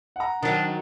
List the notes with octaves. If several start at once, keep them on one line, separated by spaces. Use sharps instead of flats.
F#5 A#5
D#3 F#3 D4